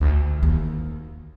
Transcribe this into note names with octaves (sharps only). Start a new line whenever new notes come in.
D2
D#2